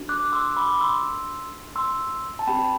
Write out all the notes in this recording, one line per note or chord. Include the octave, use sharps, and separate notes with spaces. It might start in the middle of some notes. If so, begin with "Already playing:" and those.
Already playing: D4 F#4 A4
D6 F#6
C6 E6
B5 D6
C6 E6
C6 E6
A5
C4 G4 G5 B5